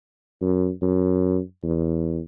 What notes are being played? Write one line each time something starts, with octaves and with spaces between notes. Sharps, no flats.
F#2
F#2
E2